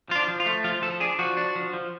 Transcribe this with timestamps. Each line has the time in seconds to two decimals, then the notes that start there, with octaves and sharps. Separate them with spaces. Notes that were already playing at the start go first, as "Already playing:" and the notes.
0.09 F3 F4
0.15 D4
0.28 F3
0.40 F4
0.46 A3
0.64 F3 F4
0.82 F3 A4
1.00 D4 G#4
1.19 F3 F#4
1.37 D4
1.55 F3
1.73 F3